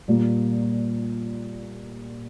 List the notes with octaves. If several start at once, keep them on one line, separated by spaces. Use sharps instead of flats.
A#2 G3 A#3